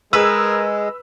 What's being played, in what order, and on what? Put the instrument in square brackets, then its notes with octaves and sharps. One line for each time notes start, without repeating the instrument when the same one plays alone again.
[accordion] G#3 [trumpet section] G#4 A#4 [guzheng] B4 [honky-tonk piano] E6